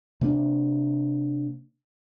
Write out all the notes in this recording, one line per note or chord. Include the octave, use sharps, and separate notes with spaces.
C3 A#3 D4